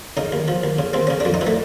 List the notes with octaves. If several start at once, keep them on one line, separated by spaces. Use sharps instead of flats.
C#3 D#4
D#2
F3
D#2
C#3
D#2 C4
C#3 C#4
F2 D4
D#4
E3
A3